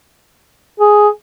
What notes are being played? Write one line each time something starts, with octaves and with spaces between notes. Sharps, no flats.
G#4